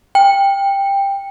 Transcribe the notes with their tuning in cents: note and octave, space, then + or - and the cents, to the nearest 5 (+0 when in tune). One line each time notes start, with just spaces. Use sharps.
G5 +15